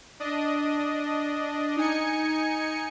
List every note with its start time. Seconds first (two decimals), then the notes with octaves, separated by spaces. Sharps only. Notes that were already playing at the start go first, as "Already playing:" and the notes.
0.20 D4 D#5
1.77 D#4 G#5 C#7